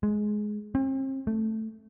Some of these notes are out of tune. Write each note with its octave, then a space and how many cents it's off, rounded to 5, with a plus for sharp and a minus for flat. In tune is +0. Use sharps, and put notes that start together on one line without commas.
G#3 +15
C4 +40
A3 +5